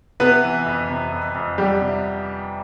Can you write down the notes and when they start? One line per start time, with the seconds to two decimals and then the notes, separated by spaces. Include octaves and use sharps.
0.20 C3 B3 B4
0.43 E3
0.66 F2
0.89 C3
1.12 F2
1.35 F2
1.58 F2 G3 G4
1.81 C3